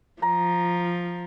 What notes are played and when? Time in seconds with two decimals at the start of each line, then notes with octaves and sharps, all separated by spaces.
0.22 F3 A#5